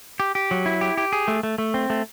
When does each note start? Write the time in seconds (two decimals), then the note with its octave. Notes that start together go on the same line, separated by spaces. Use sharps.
0.20 G4
0.35 G4
0.51 F#3
0.66 E4
0.81 G4
0.97 G4
1.13 G#4
1.28 A3
1.43 A3
1.58 A3
1.74 C4
1.90 A3